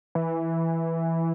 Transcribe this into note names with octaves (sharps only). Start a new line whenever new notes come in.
E3